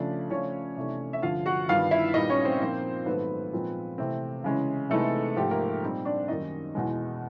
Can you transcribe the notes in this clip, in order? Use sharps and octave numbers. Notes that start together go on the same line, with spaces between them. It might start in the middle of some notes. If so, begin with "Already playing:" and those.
Already playing: C#3 F3 A3 D4 D5
C#3 F3 A3 C#4 D4 C#5
C3 E3 A3 D4
E5
G2 D3 F3 F4 F5
F#4 F#5
G2 D#3 G3 B3 F4 F5
E4 E5
A#2 G3 B3 D#4 D#5
C#4 C#5
C4 C5
A#2 F3 A#3 D#4
G#2 D#3 F#3 A3 B3 B4
A#2 F3 G#3 C4 D#4
C3 E3 A3 C4
C#3 E3 G#3 C#4
C3 E3 G#3 A3 B3 D#4 A4
G#2 F3 A3 G4
A#3 A#4
A#2 G3 C4 D#4
D4 D5
F#2 D#3 G3 A#3 C#4 D#4 D#5
E2 B2 G#3